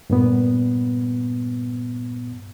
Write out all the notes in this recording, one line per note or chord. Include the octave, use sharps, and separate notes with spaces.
G2 A#2 B3